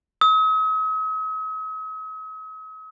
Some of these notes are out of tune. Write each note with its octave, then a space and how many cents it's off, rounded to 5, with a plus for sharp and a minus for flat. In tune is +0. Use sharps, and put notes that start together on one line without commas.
D#6 +45